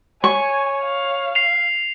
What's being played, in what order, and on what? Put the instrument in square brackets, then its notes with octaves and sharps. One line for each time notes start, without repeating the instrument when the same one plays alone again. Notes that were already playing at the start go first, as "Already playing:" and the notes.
[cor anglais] C#5 [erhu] G#5 [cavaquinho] C#6
[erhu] F5
[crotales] C7 F7